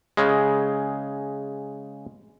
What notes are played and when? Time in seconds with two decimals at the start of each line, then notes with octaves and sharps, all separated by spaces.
0.17 C#3 G#3